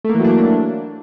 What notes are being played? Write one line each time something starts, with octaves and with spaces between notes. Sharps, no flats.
E3 F#3 A3 A#3 D4